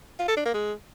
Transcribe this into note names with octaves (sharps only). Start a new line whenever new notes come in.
F4
A4
D4
A#3
G#3